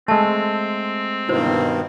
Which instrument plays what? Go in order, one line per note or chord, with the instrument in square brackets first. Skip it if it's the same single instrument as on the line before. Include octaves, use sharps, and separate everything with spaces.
[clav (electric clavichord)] G#3 A3 [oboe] C4 [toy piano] A5
[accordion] G2 B2 D#3 [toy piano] E4 F#4 C5